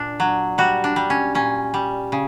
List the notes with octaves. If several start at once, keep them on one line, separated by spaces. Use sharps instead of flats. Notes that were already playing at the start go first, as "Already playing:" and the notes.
Already playing: A#2 D4
F#3
G3 F#4
D4
G3
C#4
A#2 C#4
G3
C#3